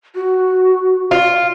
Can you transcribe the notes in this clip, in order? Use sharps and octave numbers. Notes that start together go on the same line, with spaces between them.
F#4
F4